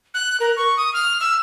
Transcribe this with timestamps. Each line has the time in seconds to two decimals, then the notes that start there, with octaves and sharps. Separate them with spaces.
0.14 F#6
0.40 A#4
0.57 C#6
0.77 D#6
0.94 F6
1.21 E6